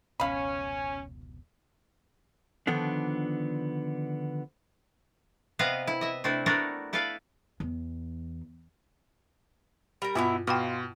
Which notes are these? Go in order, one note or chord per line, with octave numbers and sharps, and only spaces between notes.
F1 C#2 B2 C#4 F5 B5
D3 D#3 F3 B3 D4
C3 B3 B4 D#5 F5
E4
D#5 E5
C3 A3 D4 E4
A3 B3 D4 F#4 A4 A#4
E4 A4 B4 D5 F5
E2
G3 A#4
G2 B2 B3 E4 F4 E5
B2 F4 G5 B5 D6